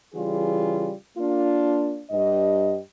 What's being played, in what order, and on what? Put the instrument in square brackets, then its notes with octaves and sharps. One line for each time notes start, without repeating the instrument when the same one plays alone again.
[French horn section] C#3 E3 G3 F4 G#4
A#3 D4 F4
G2 G4 D#5